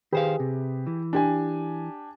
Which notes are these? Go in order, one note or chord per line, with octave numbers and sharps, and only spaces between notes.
D#3 G4 G#4 B4 C5 F5
C3
E3
D4 G4 G#5